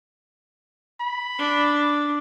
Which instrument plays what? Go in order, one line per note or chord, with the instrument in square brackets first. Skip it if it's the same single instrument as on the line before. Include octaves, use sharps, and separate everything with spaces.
[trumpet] B5
[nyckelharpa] D4